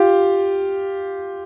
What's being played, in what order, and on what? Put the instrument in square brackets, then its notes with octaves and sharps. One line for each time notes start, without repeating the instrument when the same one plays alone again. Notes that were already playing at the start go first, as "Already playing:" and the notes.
Already playing: [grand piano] F4 G4